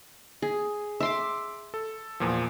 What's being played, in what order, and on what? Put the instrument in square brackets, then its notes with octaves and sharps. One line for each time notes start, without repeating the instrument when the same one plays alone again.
[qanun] G#4
E5 C6 D6
[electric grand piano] A4
E2 A#2 F3